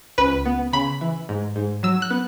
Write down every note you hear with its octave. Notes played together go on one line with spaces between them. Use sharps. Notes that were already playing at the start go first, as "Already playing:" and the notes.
C#2 B4
B3
C#3 B5
E3
G#2
G#2
F#3 E6
F#6
B3